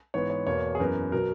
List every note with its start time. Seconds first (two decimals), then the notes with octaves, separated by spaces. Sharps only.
0.14 G#2 E3 B3 C#5
0.30 C#5
0.47 E2 B2 A#3 C#5
0.75 G#4
0.80 F#2 E3 B3 A#4
1.12 B2 F#3 B3 A#4